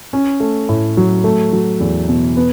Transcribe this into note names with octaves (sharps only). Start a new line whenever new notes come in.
C#4
A3
A2
F#3
A3
F#3
E2
B2
B3